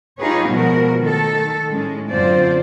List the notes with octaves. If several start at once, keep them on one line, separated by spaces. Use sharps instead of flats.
D#4 F4 G4 G#4 B4 C#5
B2 F3 G#3 F#4 A#4
D#3 A3 A4
A2 G#3 C#4
F#2 D3 C4 F4 C5 D5